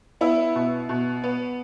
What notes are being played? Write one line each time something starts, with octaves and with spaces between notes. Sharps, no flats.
B3 E4
B2
B2
B3